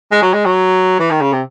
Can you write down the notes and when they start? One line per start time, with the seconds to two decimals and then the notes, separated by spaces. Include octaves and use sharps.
0.12 G#3
0.22 F#3
0.34 G#3
0.45 F#3
1.00 E3
1.11 D#3
1.22 C#3
1.33 C3